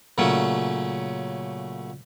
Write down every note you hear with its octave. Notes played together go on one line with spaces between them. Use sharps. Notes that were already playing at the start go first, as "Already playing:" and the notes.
A#2 C#3 F#3 A3 C#4